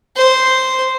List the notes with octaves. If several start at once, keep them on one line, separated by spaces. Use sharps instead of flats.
C5